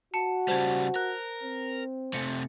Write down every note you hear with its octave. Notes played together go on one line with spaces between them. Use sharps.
F#4 A5 C#7 E7
C#3 G3 C5 A5 G#6
A#4 F#6
C4
C3 A3 C#7